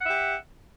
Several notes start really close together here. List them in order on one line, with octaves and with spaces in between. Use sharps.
F#5 E5 G4